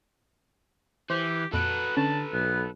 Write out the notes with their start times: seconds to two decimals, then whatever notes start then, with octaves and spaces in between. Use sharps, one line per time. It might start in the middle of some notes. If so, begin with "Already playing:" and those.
1.10 E3 G4 C5
1.53 F2 A#2 F#4 A4 B4 D7
1.97 D3 C#4 A5
2.33 B1 B3